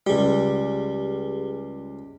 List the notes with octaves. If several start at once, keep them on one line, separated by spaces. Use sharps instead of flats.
C#2 G3 G4 G#4